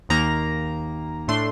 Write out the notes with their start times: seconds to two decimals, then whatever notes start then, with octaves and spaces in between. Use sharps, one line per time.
0.09 D#2 D#3 A#3 A#5
1.28 A2 A3 D4 C6